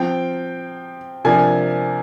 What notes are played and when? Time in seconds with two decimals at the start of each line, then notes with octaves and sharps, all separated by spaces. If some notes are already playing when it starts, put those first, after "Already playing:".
Already playing: F3 C4 G5
1.24 C3 F3 A#3 D4 G#5